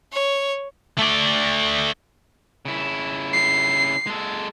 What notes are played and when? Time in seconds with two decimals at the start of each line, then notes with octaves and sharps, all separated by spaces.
0.12 C#5
0.98 A3 D5
2.65 C#3 E4
3.33 C7
4.07 G#3 A4